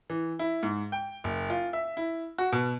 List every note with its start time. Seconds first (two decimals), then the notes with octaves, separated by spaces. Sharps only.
0.10 E3
0.39 E4
0.63 G#2
0.92 G5
1.24 F#1
1.50 F4
1.73 E5
1.97 E4
2.38 F#4
2.52 B2